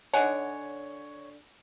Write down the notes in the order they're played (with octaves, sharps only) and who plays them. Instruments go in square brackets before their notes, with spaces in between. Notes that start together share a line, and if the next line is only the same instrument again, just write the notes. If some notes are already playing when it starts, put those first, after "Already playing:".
[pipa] D3 D#4 F#5 [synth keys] C#5 [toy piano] G#5